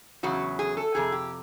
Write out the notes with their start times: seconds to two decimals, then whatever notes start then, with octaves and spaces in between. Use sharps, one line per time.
0.23 E2 C#3 F#3 F#4
0.59 G#4
0.77 A4
0.95 F2 C3 G#4
1.12 G4